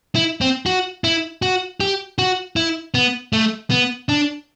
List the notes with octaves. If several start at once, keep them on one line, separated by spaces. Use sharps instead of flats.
E4
C4
F#4
E4
F#4
G4
F#4
E4
B3
A3
B3
D4